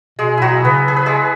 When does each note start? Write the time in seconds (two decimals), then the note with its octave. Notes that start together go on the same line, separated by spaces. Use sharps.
0.19 B2 G#3 G#4
0.37 B2 F#3 E4 F#4
0.64 C#3 B3 B4
0.87 C#3 G#4
0.96 B4
1.06 G#3 G#4